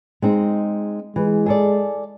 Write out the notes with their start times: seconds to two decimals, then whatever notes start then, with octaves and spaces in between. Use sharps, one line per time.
0.22 G#3 C4 D#4
1.16 E3 G#3
1.46 G#4 A4 D5